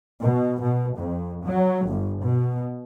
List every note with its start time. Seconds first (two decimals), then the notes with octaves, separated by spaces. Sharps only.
0.22 B2
0.63 B2
0.98 F2
1.44 F#3
1.88 G1
2.23 B2